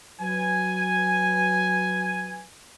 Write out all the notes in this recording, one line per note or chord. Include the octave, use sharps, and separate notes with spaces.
F#3 B4 G#5